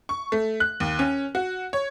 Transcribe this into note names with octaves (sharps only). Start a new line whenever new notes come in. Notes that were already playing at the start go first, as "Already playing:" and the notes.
C#6
A3
F#6
D#2
C#4
F#4
C#5